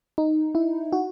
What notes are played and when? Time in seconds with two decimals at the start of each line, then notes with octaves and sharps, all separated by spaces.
0.18 D#4
0.55 E4
0.93 F#4